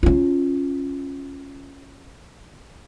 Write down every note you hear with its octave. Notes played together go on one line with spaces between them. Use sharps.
C#4 F4